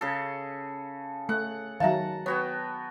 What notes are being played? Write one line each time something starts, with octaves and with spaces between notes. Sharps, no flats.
C#3 G#4 A4
A3 F#5
D#3 F#3 E5 F5 A5 A#5
B3 F#4 C#5 G5